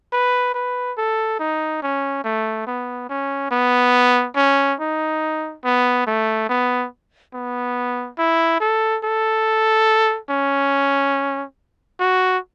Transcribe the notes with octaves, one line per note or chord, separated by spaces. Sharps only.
B4
B4
A4
D#4
C#4
A3
B3
C#4
B3
C#4
D#4
B3
A3
B3
B3
E4
A4
A4
C#4
F#4